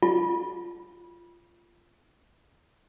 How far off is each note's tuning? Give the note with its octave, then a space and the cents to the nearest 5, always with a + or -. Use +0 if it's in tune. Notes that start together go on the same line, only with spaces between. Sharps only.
F4 -15